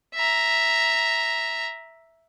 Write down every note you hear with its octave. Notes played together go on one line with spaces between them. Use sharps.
E5 A#5